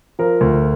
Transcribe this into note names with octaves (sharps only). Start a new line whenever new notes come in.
F3 A#4
D2